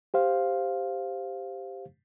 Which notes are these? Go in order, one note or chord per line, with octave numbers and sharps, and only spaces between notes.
G4 C5 F5